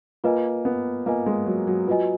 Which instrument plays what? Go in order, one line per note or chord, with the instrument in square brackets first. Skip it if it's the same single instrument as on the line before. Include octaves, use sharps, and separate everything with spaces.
[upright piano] A#3 [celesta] F4 B4 D#5 G#5
[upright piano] B3
[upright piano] A#3 [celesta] F4 B4 D#5 G#5
[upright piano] G#3
F#3
F#3
[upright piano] F#3 [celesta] F4 B4 D#5 G#5